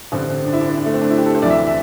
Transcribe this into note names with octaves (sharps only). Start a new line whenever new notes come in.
A1 G2 D3 C4
C4
D4
E4
D4
C4
D4
A3
C4
D4
E4
G4
A4
C5
D2 C3 E3 D5
E5
E5